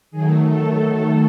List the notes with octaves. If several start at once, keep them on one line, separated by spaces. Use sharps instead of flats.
D#3 F#3 A3 G#4
A4
A4